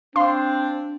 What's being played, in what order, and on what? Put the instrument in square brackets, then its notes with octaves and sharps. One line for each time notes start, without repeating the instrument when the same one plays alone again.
[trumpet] C4 [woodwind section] D4 [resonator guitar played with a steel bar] F5 [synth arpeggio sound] C6